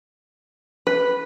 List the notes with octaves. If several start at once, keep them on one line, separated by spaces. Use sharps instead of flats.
B4